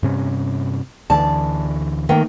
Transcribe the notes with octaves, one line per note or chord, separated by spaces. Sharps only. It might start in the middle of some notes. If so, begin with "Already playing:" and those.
G2 C3 C#4
D2 D3 E3 D5 A5
D#3 A3 A#3 G5